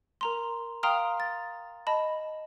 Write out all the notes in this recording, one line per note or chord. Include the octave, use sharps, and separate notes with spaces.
A#4 A#5 C6
F5 G5 A#5 C6 D#6 F6
A6
D#5 A5 B5